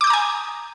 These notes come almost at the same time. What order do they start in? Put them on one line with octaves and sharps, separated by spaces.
D6 G6 D#6 A#5 G#5